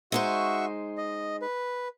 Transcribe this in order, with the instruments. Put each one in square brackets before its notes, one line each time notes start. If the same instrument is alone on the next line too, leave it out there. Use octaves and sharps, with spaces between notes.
[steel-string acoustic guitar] G#3 D#4 C5 [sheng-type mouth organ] F#4 E5 C#6
[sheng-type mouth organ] D#5
B4